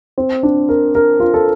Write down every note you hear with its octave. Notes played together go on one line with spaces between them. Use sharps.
C4
D4
A#4
A#4
F4
A4